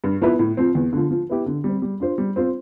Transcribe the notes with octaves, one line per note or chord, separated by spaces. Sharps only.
G2
F3 B3 E4 B4
A2
F3 C4 F4
E2
D3 F3
F3
B3 E4 G4
D3
G3 C4
G3
D4 F4 C5
G3
C4 F4 C5